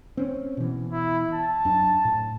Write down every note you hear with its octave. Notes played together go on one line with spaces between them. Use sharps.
C4 C#4
B2 E3
E4
A5
F#2 D4
A2